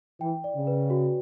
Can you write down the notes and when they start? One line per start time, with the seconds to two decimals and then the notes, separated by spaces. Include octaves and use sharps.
0.20 E3 G5
0.44 D5
0.55 C#3
0.67 B4
0.90 F#4